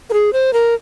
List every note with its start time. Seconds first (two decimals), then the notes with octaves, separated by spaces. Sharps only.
0.10 A#4
0.13 G#4
0.33 C5
0.53 A#4